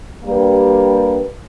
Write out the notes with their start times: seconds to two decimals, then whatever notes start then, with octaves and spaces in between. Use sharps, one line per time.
0.23 G3 A#3 D4 G4 B4